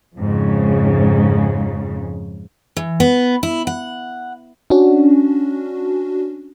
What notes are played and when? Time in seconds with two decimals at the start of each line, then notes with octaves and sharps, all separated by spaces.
0.17 F2 G#2 C#3
2.77 E3
3.00 B3
3.43 E4
3.67 F#5
4.70 C#4 D4 F#4